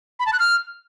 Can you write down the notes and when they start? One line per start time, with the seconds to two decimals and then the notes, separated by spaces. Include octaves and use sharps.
0.20 B5
0.26 A5
0.33 F#6
0.39 F6